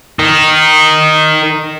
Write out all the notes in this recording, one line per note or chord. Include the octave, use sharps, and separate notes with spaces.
D#3 D#4